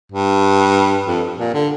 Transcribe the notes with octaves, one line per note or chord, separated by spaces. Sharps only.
G2
F2
A#2
D3